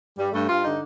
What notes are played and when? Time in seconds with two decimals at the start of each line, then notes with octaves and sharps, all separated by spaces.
0.18 G2 G3
0.33 G2 A3
0.49 G2 F4
0.64 D3 D#4